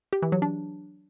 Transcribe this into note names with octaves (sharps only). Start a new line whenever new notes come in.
G4
E3
F#3
D4